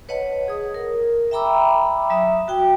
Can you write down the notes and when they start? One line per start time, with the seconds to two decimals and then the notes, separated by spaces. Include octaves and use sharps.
0.09 B4 C#5 D#5 F#5 A5
0.48 G#4 D#6
0.74 A#4
1.31 E5 G5 A#5 B5 D6 E6
2.10 F#3 E5 D#6
2.48 F#4 G5